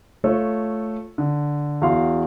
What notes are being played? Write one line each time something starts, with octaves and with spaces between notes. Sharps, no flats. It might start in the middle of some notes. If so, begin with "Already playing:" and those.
A3 F4 A4 C#5
D3
E2 F#4 F5 C6